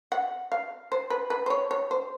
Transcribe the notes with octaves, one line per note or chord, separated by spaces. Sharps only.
F#5
F5
C5
B4
B4
C5
C#5
C#5
C5